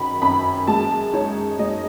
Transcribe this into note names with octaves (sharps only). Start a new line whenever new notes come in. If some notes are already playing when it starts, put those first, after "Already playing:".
Already playing: F#2 D#3 F#3 B5
F#2 B5
G#3 A5
D#4 C#5
G#3 D#5